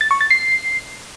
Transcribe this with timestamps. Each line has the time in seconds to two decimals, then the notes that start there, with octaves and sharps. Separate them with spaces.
0.01 A6
0.11 C#6
0.21 A6
0.30 C7